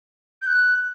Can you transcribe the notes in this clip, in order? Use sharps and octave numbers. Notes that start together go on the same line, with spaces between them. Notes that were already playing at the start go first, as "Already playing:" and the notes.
G6
F#6